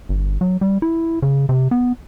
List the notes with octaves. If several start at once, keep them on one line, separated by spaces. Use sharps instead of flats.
G1
F#3
G3
E4
C#3
C3
B3